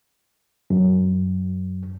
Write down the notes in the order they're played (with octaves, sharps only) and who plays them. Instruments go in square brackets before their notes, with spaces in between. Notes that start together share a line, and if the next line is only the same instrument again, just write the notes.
[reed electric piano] F#2